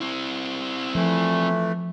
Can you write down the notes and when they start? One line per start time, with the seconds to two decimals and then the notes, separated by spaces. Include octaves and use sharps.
0.01 C4 E4
0.95 E3 F3 A3